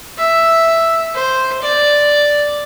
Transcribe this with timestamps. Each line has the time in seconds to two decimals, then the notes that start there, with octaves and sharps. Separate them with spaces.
0.18 E5
1.14 C5
1.62 D5